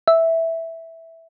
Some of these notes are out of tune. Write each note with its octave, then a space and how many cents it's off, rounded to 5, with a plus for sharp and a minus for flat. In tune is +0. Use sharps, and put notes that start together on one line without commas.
E5 -5